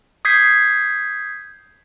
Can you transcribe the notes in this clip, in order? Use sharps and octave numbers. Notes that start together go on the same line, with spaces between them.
D#6 G6 G#6 B6 C7